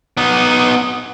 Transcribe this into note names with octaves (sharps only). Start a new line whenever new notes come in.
B3 D#4